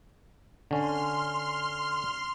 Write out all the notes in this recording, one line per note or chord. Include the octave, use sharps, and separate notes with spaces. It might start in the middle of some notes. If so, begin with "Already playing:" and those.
D3 C#4 C6 F6